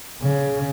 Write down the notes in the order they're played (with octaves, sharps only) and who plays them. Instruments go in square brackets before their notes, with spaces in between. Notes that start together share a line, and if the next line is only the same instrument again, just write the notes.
[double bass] C#3